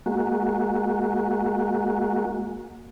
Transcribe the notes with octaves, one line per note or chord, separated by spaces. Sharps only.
G#3 A#3 F#4